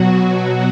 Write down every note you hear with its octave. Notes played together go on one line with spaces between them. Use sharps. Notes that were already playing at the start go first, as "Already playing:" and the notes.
Already playing: B2 F#3 F#4